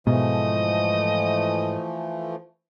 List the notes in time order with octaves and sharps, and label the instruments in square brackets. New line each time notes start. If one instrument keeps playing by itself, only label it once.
[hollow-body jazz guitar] G#2 [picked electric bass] B2 [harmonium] E3 F3 A3 [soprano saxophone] D#5